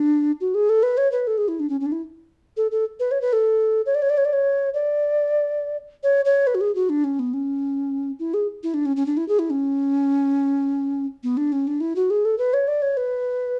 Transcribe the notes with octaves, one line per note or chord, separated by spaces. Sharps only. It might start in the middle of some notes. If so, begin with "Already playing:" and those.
Already playing: D4
F#4
G#4
A4
B4
C#5
B4
A4
G#4
E4
D4
C#4
C#4
D4
E4
A4
A4
B4
C#5
B4
A4
C#5
D5
C#5
D5
C#5
D5
C#5
D5
C#5
C#5
B4
F#4
G#4
F#4
D4
C#4
B3
C#4
E4
G#4
E4
D4
C#4
C#4
D4
E4
G#4
E4
C#4
B3
D4
C#4
D4
E4
F#4
G#4
A4
B4
C#5
D5
C#5
B4